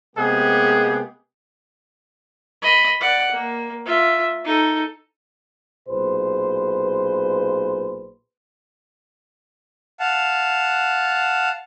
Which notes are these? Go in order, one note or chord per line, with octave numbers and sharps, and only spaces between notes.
C3 G#3 A#3 B3 G4 G#4
D#5 B5
D5 F#5
A#3
F4 E5
D#4 A4
B1 A#2 G#4 B4 C5
F5 F#5 A5